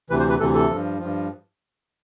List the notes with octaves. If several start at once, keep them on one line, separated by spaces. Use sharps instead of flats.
D2 C3 E3 B4
C5
B4
D2 C3 E3 A4
A4
G2 F3
G2 F3